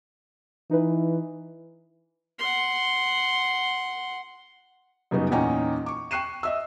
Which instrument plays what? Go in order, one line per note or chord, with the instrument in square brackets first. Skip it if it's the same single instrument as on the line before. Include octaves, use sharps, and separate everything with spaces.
[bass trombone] E3 [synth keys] D#4 B4
[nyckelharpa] F#5 C6
[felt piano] F#2 C#3 G3 B3 D#4
E2 A#2 C#4 D#4 G5 A#5
C#6 D6
G5 C#6 F#6 C7 D#7 E7
D#5 E5 E6